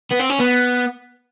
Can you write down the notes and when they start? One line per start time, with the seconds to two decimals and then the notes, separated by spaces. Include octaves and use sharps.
0.11 B3
0.19 C4
0.30 C#4
0.40 B3